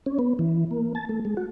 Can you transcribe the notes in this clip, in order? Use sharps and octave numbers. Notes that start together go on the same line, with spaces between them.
C#4
B3
E3
A#3
A5
A3
G#3
F#4